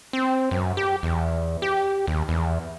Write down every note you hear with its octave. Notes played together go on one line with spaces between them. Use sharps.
C4
F#2
G4
E2
G4
D#2
E2